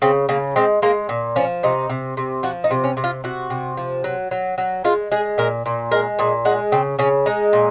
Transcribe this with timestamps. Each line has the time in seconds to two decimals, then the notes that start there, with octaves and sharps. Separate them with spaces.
0.02 C#3 C4
0.29 C#3 A#3
0.56 G#3 C4
0.82 G#3 A#3
1.09 A#2
1.36 F3 C#4
1.63 C3 D#4
1.89 C3
2.17 C3
2.43 F3 F#4
2.64 D#4
2.71 C3
2.84 C#4
2.97 C3
3.04 F4
3.24 C3 F#4
3.50 C3
3.77 F3
4.04 F#3
4.31 F#3
4.58 F#3
4.84 G#3 F4
5.11 G#3 G#4
5.38 A#2 A#4
5.66 A#2
5.91 G#3 A#4
6.19 A#2 G#4
6.45 G#3 F#4
6.72 C#3 C4
6.99 C#3 C#4
7.26 G#3 D#4
7.53 A#2